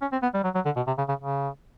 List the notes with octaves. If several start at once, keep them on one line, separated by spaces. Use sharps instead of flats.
C#4
C4
B3
G3
F#3
F#3
D3
B2
C3
C#3
C#3
C#3